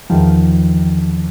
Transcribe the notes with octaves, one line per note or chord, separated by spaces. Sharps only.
E2 D#3 F3